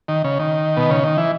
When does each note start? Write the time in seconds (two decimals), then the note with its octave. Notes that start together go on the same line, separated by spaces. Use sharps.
0.08 D#3
0.24 C#3
0.39 D#3
0.77 B2
0.90 C#3
1.03 D#3
1.18 E3